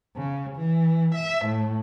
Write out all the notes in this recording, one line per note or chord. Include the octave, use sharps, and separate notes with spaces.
C#3
E3
E5
A2